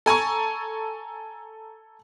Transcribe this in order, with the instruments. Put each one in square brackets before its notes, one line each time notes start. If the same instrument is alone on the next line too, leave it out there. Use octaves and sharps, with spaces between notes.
[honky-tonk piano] A4 G#5 A#5 C#6